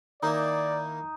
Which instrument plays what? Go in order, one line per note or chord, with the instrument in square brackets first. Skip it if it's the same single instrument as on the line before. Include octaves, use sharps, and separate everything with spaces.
[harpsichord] D#3 A#3 E4 [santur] D#4 [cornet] D5